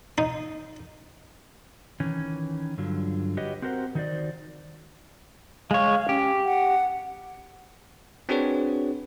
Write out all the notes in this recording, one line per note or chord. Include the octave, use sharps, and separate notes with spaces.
D#4
D#3 E3 C#4
G2 D3 F#3 F4
F#4 G4 B4 C#5 D#5
C4 F#4 G4 A#4 C5 F#5
D#3 D#4 F#4 C5 D5
G#3 C#5 F5
C#4 G4
F#5
C4 D4 F#4 G#4 B4 C#5